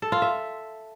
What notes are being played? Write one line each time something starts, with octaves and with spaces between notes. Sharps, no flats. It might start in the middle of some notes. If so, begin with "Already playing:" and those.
A4
F4
E5